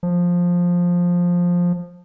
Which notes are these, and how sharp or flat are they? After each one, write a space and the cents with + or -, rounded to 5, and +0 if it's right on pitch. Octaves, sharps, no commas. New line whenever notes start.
F3 +10